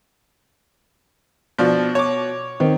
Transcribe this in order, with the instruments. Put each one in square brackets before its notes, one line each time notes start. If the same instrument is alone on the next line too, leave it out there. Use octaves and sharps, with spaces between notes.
[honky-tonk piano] B2 [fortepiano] F3 D4
[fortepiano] C#5 D6
[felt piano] D#3 [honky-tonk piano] C4